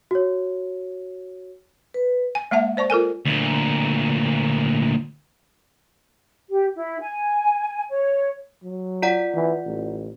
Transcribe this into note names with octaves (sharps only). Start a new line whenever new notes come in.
F#4 C#5
B4
G#5
G#3 A#3 E5 F#5 A5
C5 D5 A5 C#6
F4 A4 A#4 G#5
D2 A#2
G4
E4
G#5
C#5
F#3
F4 D5 F#5
E3
A1